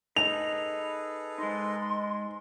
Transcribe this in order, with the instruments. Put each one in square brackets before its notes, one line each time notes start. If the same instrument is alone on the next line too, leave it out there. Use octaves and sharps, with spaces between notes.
[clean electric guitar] D#4 [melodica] G#4 A4 B4 [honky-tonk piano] F7
[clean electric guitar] G#3 D#4 [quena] C6